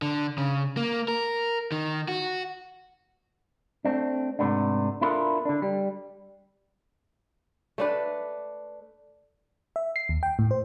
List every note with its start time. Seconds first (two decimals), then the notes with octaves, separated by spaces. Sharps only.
0.02 D3
0.38 C#3
0.77 A#3
1.08 A#4
1.72 D#3
2.08 F#4
3.85 A3 C4 D4
4.39 G#2 C3 A3 B3 D4
5.01 B3 D4 E4 F4 A4 A#4
5.45 D3 D4
5.62 G3
7.78 A3 D4 B4
9.76 E5
9.96 C7
10.09 D#2
10.23 G5
10.39 A2
10.51 C5